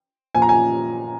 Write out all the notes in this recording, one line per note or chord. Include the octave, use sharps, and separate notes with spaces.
A#2 F3 G#5
A#5
G#5